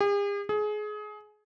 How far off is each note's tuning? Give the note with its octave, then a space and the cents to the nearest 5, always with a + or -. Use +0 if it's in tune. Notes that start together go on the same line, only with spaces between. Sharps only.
G#4 -45
G#4 +25